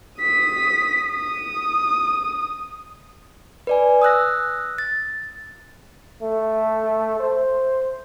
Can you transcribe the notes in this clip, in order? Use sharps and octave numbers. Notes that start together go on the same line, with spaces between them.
D#6 B6
D#6
B4 D5 G#5
D#6 E6 F#6 A#6
A6
A3
C5